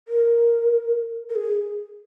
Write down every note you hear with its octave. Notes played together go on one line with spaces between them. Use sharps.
A#4
A#4
G#4